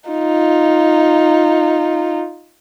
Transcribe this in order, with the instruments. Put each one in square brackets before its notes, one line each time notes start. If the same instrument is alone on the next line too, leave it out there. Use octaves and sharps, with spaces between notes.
[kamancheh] D#4 F4